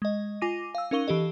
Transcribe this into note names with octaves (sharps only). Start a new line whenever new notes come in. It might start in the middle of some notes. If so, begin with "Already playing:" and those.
G#3 D#5
F4 G#5 D6 A#6 D#7
F5 E6
C#4 D#4 A#4 F5 C#6 G7
E3 G4 A4 D#5